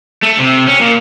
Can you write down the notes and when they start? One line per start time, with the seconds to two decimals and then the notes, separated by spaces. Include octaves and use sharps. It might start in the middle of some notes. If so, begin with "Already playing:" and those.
0.23 A3
0.39 C3
0.68 C#4
0.81 A#2